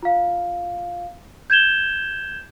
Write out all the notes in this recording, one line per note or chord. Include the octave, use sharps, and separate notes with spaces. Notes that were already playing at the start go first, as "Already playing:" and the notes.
F4 F5
G6 G#6 E7 G7